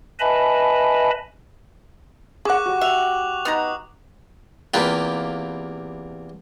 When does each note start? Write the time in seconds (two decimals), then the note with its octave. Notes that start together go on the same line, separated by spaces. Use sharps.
0.19 B4 D#5 E5 G#5 A5 B5
2.45 G#4 F#5 C#6 D6 F#6
2.65 G3 F#4
2.81 E5 F#6 F7 F#7
3.45 B3 D#4 A#5 D#6
4.74 E2 C3 A#3 F4 G4 B4